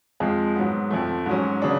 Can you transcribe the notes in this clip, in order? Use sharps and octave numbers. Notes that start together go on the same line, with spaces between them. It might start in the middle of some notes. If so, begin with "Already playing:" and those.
F2 F3 G#3
G#2 F#3 B3
F2 F3 A3
G#2 F#3 C#4
C#3 F#3 B3 D4